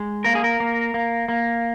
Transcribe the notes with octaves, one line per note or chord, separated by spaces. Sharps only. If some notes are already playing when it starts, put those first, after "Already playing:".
Already playing: G#3
A#3 A#4
G#4
A#4
A#3
A#3
A#3